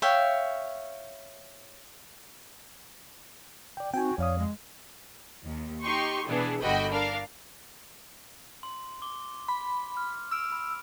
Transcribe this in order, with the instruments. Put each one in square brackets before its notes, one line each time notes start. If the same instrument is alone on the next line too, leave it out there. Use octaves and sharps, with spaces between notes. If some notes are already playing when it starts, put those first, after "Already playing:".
[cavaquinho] C#5 E5 F5 G5
[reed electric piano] D5 G5
[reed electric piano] C4 D#4 [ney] F#4 [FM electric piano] G5 G#5
[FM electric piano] F2 [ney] C#5 [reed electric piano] D5 F5 D#6
[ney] G#3
[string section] D#2
D#4 G4 C6 C#6
B2 E3 B3 D4 G#4
G1 D3 F#4 D#5 G5 B5
D4 A#4 F5
[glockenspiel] C6
D6 G7
[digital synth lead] B5
[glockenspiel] F6
[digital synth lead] E6 [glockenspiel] F6 D7 F7
[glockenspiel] B5